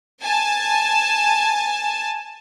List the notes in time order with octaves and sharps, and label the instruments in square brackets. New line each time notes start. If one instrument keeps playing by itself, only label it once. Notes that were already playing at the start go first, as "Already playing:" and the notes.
[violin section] G#5 A5